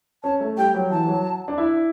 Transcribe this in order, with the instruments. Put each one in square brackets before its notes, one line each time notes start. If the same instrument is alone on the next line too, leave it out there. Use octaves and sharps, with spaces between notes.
[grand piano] C#4 [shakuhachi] A5
[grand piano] A3
[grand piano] G3 [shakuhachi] G5
[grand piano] F#3
[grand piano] E3 [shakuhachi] A5
[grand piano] F#3
D4
E4